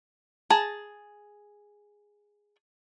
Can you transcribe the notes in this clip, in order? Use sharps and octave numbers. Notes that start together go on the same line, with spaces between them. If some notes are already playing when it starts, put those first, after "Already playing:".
G#4 A5 A#5